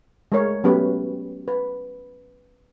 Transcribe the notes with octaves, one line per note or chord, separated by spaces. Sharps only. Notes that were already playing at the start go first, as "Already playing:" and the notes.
G#3 A3 G#4 A#4 C#5
F#3 A3 B3 C#4 G4 B4
B4